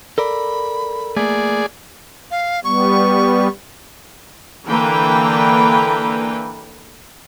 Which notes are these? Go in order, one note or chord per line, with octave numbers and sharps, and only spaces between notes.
A4 A#4 D5 B5
A3 A#3 G#4 D5
F5
G3 B3 C#6
D3 E3 A#3 B4 G5